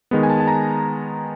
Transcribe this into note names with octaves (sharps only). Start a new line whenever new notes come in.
D#3 G#3 B3
G#5
A5
A5
A#5